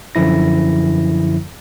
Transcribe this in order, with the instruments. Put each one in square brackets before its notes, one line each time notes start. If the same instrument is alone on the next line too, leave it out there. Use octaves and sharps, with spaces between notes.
[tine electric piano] F#2 D3 F3 E4 A#6